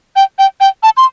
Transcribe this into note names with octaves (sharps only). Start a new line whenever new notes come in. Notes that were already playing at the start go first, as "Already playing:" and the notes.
G5
G5
G5
A5
C6